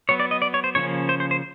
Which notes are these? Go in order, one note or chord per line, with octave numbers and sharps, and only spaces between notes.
F#3 B3 C#5
D5
D#5
D5
C#5
C5
C#3 F3 A#3 C#4 C#5
C5
C5
C5